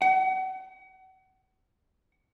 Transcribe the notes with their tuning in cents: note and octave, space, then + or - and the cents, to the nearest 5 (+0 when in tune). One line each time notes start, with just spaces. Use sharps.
F#5 +35